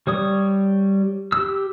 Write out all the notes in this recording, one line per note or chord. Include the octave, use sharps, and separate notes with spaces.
G3 C#5 D#6
G4 E6